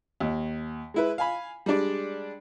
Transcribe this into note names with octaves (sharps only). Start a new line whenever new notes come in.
D#2
G#3 E4 B4
F5 G#5 B5
G3 G#3 D4 D5